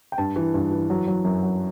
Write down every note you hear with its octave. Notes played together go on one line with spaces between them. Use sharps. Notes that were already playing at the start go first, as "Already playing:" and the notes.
G5
G2 A5
E3
G2
E3
F#3
F#3
F#2
F#3